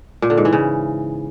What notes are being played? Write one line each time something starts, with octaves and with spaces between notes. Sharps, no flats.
A#2
D3
G#2
E3
C#3